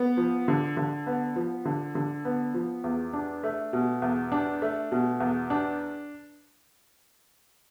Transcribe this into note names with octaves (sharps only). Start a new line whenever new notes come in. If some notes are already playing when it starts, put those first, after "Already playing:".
Already playing: B3
F3
D3
D3
B3
F3
D3
D3
B3
F3
E2
D4
A3
B2
E2
D4
A3
B2
E2
D4